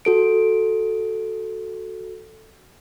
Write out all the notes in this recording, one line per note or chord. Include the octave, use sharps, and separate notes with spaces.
F#4 A4 D7